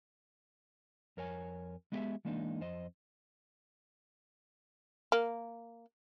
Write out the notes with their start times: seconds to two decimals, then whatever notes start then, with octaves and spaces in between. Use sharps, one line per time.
1.17 F2 A#4 C#5 G#5
1.92 G#3 B3 E4 G4 G#4 E5
2.25 E3 G#3 A#3 D4 D#4
2.61 F2 C5 D#5
5.12 A#3